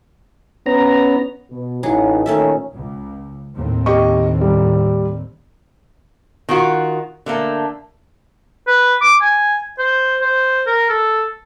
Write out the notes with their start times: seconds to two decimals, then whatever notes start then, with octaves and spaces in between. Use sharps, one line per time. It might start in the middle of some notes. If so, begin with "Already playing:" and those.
0.66 B3 C#4 A#5
1.51 B2
1.83 A1 F#3 D#4 G#4
2.26 A#2 D#3 A3 C#4 A4 E5
2.73 C#2
3.54 D#2 A2 C4
3.86 G4 D#5 C#6
4.41 G3
6.49 D#3 F4 F#4
7.26 D3 A3 A#3
8.67 B4
9.01 D6
9.22 G#5
9.79 C5
10.21 C5
10.67 A#4
10.90 A4